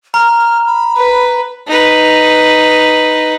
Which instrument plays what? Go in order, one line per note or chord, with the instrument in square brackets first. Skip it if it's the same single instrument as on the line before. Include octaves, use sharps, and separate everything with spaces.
[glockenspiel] A#5 [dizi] F6
[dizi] B5
[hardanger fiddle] B4
[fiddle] D#4 B4